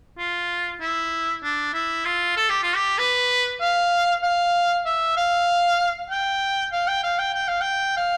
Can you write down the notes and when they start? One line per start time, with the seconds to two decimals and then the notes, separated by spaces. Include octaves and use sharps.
0.18 F4
0.81 E4
1.43 D4
1.74 E4
2.05 F4
2.36 A4
2.49 G4
2.63 F4
2.76 G4
2.98 B4
3.61 F5
4.23 F5
4.86 E5
5.17 F5
6.10 G5
6.72 F5
6.88 G5
7.03 F5
7.19 G5
7.34 G5
7.48 F5
7.61 G5
7.97 F5